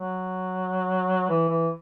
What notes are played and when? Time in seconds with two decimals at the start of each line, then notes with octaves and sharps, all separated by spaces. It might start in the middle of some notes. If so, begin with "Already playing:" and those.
Already playing: F#3
1.29 E3
1.49 E3